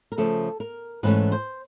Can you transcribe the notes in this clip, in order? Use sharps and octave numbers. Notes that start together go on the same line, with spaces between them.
A#4
C#3 F3 A3 A4
A#4
G#2 E3 A3 C#4 B4
C5